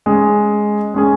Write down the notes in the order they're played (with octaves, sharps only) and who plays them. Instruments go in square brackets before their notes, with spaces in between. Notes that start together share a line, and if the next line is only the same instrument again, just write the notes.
[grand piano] G#3 C#4 G#4
G#3 C#4 G#4